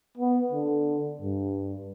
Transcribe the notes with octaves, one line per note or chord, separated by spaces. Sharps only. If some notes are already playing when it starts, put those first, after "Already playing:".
B3
D3
G2